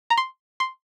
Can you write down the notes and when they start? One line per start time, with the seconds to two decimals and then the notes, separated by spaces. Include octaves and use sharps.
0.10 A#5
0.17 C6
0.60 C6